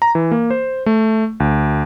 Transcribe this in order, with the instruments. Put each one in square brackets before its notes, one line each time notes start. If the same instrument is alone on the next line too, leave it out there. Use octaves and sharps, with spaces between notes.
[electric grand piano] A#5
E3
A#3
C5
A3
D2